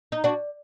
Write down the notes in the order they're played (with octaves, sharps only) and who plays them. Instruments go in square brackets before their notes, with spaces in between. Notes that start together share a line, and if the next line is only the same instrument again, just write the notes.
[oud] D#4
[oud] D4 F#4 [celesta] D5